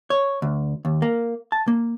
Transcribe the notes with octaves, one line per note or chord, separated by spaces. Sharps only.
C#5
D2
D#2
A#3
A5
A#3